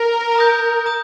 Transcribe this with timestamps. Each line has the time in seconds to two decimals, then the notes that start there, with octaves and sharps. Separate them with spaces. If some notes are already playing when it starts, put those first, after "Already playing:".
Already playing: A#4
0.35 A#5 D#6 G6
0.86 A#5 D#6 G6